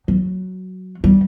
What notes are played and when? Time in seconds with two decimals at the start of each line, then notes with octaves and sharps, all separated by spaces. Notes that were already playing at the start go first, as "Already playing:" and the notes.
0.08 F#3
1.04 G3